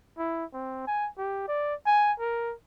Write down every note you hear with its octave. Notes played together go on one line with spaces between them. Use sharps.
E4
C4
G#5
G4
D5
G#5
A#4